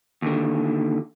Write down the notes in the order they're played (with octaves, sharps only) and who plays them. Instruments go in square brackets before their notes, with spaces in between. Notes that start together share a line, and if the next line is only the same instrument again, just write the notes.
[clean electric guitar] D#2 D3